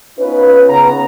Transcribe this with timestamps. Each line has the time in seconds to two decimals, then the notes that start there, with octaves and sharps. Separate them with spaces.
0.19 B3 C#4 D#4 F4 B4
0.69 C#3 B3 A#5